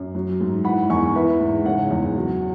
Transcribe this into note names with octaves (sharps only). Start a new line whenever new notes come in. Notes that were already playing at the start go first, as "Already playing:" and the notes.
Already playing: F#2
F#3
G#2
E3 F#5 B5
E2 G#5 C#6
E3 B4 E5
G#2
C#3 C#5 F#5
E2
F#3